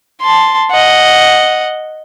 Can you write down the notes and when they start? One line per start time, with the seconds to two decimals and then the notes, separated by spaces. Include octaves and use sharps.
0.21 A5 C6
0.71 D#5 F#5